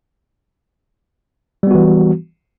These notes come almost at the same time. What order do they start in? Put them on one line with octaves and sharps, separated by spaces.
G3 B3 F#4 E3